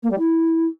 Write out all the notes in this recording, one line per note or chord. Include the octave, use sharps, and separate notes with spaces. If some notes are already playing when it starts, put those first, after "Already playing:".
A#3
G3
E4